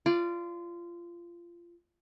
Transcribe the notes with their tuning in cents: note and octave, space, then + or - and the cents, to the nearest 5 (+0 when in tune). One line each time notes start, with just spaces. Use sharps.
F4 -20 D5 +0